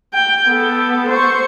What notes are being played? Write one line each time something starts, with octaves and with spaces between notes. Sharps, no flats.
G5
B3 A4
C5 C#6